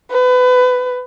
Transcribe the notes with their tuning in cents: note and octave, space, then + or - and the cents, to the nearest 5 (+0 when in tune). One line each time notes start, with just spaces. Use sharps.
B4 +25